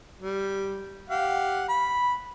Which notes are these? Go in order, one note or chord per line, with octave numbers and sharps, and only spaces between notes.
G3
G4 F5 F#5
B5